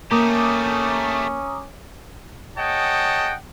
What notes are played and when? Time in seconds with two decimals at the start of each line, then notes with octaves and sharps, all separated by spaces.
0.11 A3 A#3 C#4 G4 A#5 D6 D#6
2.57 G#4 C#5 D#5 F#5 G5 A5